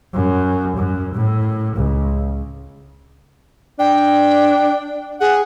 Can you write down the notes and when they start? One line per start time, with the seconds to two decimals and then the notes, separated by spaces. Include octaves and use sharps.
0.14 F#2
0.77 F#2
1.14 A2
1.76 C#2
3.79 D4 G5
5.21 G#4 F#5